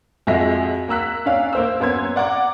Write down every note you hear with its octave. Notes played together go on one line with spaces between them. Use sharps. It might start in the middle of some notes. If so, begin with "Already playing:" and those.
F2 G#3 F#4 G#4 E5 A#6
A#3 A#5 E6 F#6 B6
C#4 D5 F5 F#6
A#3 C5 E6
F#2 B3 C6 G#6
D5 F#5 A#5 D6